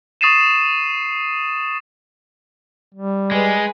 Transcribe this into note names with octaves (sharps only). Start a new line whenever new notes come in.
C#6 D#6 A6 C7 D#7 E7
G3
G#3 G#4 B4